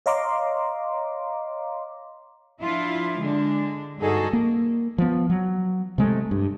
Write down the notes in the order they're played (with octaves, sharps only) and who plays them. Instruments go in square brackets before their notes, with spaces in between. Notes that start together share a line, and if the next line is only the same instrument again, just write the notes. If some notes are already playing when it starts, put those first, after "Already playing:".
[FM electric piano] C#5 D#5 F5 A#5 C6 D6
[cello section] F3 D4 E4 F4
D3 G#3 D4
G2 D#4 F#4 G#4 A4
[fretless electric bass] A#3
F3 B3
F#3
C3 G#3 A3
G2